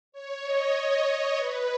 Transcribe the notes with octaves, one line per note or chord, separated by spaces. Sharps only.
C#5
D#5
B4